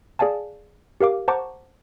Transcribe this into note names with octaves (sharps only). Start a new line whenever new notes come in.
G#4 D5 F5 G#5 A5
G4 A#4 F5 D6
C5 F#5 A5 A#5 C#6 D6